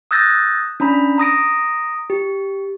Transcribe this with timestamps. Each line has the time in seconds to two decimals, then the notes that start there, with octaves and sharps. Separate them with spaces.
0.11 D#6 E6 F#6 G6 A6 A#6
0.80 C#4 D4 A#5 B5
1.18 A#5 D#6 A#6 D7
2.10 G4